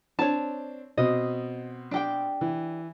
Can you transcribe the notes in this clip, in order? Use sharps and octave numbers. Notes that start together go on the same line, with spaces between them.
C4 D4 C#5 A5
B2 C4 D#5
D4 G4 G5
E3